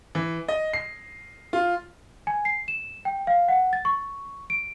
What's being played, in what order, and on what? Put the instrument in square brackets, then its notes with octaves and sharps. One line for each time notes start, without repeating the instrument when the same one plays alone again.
[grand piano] E3
D#5
C7
F4
[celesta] G#5
C7
E7
G5
F5
F#5
A6
C#6
D7